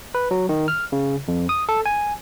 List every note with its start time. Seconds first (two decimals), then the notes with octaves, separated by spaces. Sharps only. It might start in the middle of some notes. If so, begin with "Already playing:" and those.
0.15 B4
0.31 F#3
0.49 D#3
0.68 F6
0.92 C#3
1.28 F2
1.49 D#6
1.69 A4
1.86 G#5